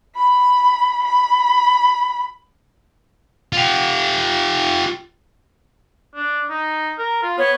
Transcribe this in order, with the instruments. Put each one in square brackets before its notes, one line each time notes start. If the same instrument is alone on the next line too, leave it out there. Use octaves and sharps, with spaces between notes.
[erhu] B5
B5
[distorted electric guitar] F4 G4
[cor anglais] D4
D#4
A#4
F4
[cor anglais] B3 [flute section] C#5